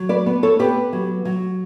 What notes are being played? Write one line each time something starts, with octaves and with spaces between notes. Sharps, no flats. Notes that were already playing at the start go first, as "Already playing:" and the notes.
Already playing: F#3
B4 D5
B3
A4 C#5
B3 G4 B4
F#3
F#3